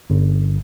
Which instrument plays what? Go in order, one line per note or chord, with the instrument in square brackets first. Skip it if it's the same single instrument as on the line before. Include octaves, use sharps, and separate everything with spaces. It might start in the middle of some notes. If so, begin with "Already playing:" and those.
[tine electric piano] G1